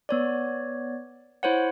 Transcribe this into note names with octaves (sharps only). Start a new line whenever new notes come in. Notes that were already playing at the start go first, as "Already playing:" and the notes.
B3 C#5 D5
E4 C5 C#5 F#5